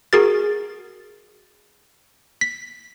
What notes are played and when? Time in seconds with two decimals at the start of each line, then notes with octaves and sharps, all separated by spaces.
0.13 F#4 G#4 A#4 A6
2.41 B6